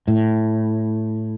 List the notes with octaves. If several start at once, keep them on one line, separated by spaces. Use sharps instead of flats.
A2